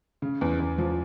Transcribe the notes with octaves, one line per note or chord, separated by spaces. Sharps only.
C#3
E2
E2
F3